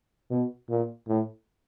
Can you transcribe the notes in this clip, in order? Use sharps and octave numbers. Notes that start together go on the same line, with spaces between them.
B2
A#2
A2